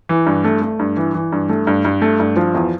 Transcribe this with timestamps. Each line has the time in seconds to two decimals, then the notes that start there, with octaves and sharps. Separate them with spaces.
0.09 E3
0.26 G2
0.44 A3
0.62 A3
0.79 G2
0.97 E3
1.14 E3
1.32 G2
1.49 A3
1.67 G2
1.85 G2
2.02 A3
2.20 G2
2.36 F3
2.54 E2